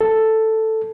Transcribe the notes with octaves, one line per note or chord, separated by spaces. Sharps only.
A4